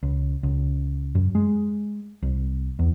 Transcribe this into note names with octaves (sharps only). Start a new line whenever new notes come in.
C#2
C#2
F#2
G#3
C2
E2